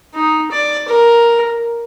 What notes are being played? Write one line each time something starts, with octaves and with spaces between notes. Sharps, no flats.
D#4
D5
A#4